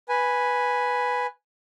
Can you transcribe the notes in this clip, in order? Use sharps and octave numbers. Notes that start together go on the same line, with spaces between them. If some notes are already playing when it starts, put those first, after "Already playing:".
B4 G#5